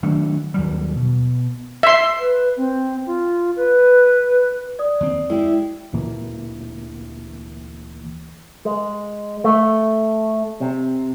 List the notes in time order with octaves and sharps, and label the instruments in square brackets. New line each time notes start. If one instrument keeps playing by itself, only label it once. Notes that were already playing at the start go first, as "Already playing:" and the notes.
[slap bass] D#3 F#3 A3 D4
D#2 F#3 G3
B2
[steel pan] E5 C6
[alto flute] B4
C4
F4
B4
[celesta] D5 D#6
[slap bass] D#2 C4
[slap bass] G#3 [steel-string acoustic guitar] E4 G4
[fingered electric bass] D2 A#2 E3 A#3
[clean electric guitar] G#3
A3
C3